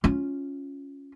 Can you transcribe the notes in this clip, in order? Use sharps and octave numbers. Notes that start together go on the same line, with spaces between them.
C#4 F4